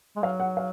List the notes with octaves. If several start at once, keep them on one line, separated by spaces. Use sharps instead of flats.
G#3
F#3 F5
F#5
F5